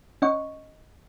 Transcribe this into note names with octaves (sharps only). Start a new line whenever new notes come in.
C#4 D#5 F#5 C#6